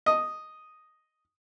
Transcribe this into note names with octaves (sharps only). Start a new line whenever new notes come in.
D#5